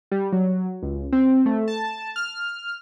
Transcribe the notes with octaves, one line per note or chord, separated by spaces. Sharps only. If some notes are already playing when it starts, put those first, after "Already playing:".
G3
F#3
C#2
C4
A3
A5
F6